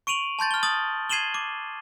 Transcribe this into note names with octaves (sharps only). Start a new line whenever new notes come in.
C#6 D7 D#7 F7 F#7
A5 C6 G6 A6
F6 G7
D#6 A6 F#7
G#6 C7 D#7 E7 F#7 G7
D6